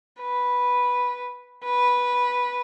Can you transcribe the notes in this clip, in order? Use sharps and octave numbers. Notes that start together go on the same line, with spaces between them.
B4
B4